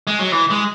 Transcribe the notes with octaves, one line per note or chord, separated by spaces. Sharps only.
G#3
F#3
E3
G#3